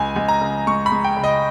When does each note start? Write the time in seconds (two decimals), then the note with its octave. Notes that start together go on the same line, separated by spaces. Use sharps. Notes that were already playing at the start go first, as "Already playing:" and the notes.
Already playing: C#2 G#5
0.16 C#2
0.28 A#5
0.41 C#3
0.67 G#3 C#6
0.86 B5
0.92 G#3
1.04 G5
1.17 C#3
1.24 D#5